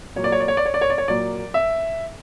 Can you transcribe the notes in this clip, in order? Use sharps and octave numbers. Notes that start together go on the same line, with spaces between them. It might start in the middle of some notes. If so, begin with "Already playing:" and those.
A#2 F#3 A#3 C#5
D5
C#5
D5
C#5
D5
C#5
D5
C#5
D5
C#5
A#2 F#3 A#3 D5
E5